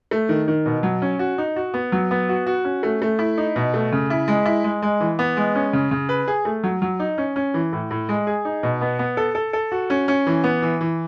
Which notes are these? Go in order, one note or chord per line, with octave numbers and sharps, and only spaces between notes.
A3
D#3
D#3
B2
F#3
C#4
F#4
D#4
F#4
B3
F#3
B3
F#4
F#4
C#4
A3
A3
E4
D#4
B2
A3
C#3
E4
G#3
E4
G#3
G#3
E3
B3
G#3
C#4
C#3
C#3
B4
G#4
A3
F#3
F#3
D#4
C#4
C#4
E3
A2
A2
G#3
G#4
D#4
B2
B3
B3
A4
A4
A4
F#4
C#4
C#4
E3
B3
E3
E3